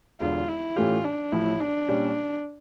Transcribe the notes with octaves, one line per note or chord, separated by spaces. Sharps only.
E1 E2 D3 F4
E4
A2 E3 A3 C#4 F4 G4
D4
A1 A2 F3 E4
D4
A#2 G3 C#4 G4